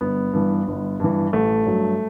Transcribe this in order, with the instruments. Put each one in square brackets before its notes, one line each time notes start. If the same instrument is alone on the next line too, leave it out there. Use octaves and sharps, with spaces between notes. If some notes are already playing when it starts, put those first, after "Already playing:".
[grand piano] G1 B3
G2 E3
G1
G2 E3
A1 A3
G2 F#3